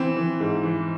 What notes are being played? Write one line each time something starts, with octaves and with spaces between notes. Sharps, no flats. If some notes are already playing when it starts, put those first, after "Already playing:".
Already playing: E3 C4
E3
G#2
E3